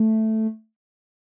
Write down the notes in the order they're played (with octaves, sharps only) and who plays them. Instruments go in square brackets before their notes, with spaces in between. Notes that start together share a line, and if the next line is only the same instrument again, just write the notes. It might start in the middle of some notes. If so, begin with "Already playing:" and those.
Already playing: [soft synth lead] A3